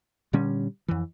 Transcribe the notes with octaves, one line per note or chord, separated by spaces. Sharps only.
A#2 D3 G3 C#4
F2 E3